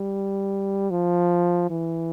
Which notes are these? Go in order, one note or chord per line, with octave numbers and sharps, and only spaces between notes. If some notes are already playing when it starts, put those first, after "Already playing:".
Already playing: G3
F3
E3